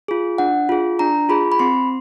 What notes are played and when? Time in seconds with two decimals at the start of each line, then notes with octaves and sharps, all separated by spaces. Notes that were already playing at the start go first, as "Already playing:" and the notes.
0.08 F4 G#4
0.38 D4 F#5
0.69 F4 G#4
0.99 D4 A#5
1.29 F4 G#4 B5
1.52 B5
1.59 C4 C6